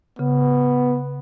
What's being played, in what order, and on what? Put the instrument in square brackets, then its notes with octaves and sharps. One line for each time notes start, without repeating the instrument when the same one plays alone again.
[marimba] C#3 [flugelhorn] B3